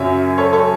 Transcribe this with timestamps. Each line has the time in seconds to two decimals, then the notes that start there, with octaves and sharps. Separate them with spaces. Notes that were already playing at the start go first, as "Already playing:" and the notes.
Already playing: F#2 C#3 F#3 C#5 E5
0.38 A4 C#5
0.53 A4 C#5